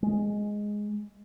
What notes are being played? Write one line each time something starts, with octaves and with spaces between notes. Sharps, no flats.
G#3